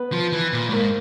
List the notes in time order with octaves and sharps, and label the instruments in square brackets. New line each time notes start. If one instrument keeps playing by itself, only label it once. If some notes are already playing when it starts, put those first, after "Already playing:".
Already playing: [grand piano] B3 B4
[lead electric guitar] F3
E3
A#2
A2
[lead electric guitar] G#2 [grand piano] A#3 A#4